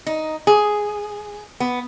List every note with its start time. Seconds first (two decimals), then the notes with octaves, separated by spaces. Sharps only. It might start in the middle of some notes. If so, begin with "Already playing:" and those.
0.06 D#4
0.47 G#4
1.60 B3